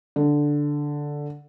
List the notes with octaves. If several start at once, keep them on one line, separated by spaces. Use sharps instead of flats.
D3